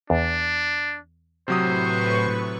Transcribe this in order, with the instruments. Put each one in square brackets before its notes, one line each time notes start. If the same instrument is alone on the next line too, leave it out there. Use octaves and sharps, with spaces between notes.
[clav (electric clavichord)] E2 [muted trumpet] D4
[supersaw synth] A2 B4 C#6 [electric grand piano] C3 F#3 D#6 [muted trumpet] C5